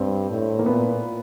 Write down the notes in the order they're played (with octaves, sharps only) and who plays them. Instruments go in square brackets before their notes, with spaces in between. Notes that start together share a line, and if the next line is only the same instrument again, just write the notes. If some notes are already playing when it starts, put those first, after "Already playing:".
Already playing: [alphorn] G2 [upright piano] C4
[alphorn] A2
[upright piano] A#3
[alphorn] A#2 [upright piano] B3